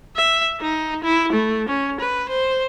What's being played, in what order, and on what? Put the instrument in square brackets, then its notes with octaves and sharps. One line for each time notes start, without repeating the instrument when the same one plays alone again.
[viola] E5
D#4
E4
A3
C#4
B4
C5